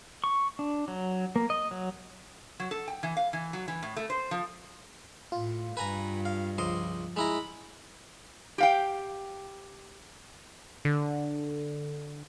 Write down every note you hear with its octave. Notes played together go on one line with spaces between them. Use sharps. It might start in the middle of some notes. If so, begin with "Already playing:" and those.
C#6
D4
F#3
A#3
D#5
F#3
F#3
A4
G5
E3
F5
E3
F#3
E3
A2
A3
C5
F3
A2 F4
G2 B4 G#5 A#5
F5
C#2 F3 D#5 C6
G#3 E4 A#5 B5
G4 F5 G5
D3